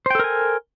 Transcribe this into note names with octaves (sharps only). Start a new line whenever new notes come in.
A4 A#4 C5 G5 G#5